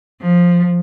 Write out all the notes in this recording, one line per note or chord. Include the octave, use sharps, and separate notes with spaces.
F3